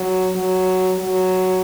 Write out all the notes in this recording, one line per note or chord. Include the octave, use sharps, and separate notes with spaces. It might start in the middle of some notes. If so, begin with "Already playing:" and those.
Already playing: F#3
F#3
F#3